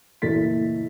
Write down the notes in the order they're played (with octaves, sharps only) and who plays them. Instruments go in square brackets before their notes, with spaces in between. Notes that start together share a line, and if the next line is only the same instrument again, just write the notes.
[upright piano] F#1 A#2 E3 A3 A6 B6